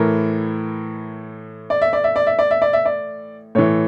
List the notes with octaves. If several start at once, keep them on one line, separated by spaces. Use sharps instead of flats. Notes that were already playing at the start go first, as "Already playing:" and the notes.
Already playing: A2 E3 A#4
D5
E5
D5
E5
D5
E5
D5
E5
D5
E5
D5
A2 E3 C#5